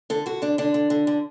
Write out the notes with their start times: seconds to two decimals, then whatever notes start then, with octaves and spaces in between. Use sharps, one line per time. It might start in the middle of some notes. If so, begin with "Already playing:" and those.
0.10 D3 A4
0.26 D3 F#4
0.42 D3 D4
0.58 D3 D4
0.74 D3
0.90 D3
1.07 D3